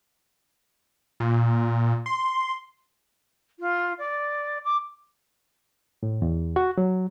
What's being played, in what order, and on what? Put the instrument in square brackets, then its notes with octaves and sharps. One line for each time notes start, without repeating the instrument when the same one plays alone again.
[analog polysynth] A#2
C6
[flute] F4
D5
D6
[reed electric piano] A2
E2
F#4
F#3